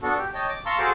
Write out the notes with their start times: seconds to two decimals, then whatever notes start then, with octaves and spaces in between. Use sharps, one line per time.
0.03 B3 D4 F#4 A4
0.17 G4
0.34 C#5 D#5 G5 A5
0.49 D6
0.66 F5 A5 A#5 C6 C#6 E6
0.79 F#4 G#4 A4 C5 A5 D6